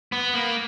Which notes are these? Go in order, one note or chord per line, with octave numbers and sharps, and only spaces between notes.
B3
A#3